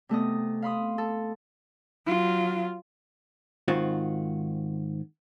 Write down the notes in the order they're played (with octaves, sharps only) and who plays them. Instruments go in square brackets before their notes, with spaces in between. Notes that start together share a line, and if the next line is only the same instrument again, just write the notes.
[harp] C3 A3 B3 D#5
F5 B5 C6 D#6
A4
[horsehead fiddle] F#3 F4
[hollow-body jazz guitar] G#2 D#3 C4 F4 F#4